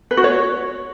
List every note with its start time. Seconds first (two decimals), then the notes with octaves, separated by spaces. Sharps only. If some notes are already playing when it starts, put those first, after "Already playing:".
0.11 B4
0.17 F#4
0.24 C#5